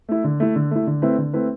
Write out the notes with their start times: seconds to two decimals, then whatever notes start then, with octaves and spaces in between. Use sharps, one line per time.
0.09 A3 E4
0.24 D3
0.40 A3 E4
0.56 D3
0.71 A3 E4
0.87 D3
1.02 A3 C4 E4 B4
1.18 D3
1.34 A3 C4 E4 B4